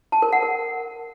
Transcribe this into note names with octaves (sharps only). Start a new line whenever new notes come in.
A5
A#4
F#5
A#4